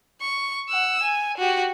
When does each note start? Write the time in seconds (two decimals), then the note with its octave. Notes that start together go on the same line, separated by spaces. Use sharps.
0.21 C#6
0.69 F#5 E6
1.03 G#5
1.37 F#4 G4